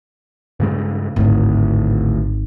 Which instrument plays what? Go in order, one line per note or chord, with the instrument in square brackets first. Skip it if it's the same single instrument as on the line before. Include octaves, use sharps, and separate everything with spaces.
[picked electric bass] G2 C#3 G#3
[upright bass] G#1 [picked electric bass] D2 A2